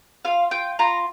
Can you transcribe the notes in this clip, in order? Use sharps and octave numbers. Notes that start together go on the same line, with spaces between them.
F4 F5
F4 G5
F4 A#5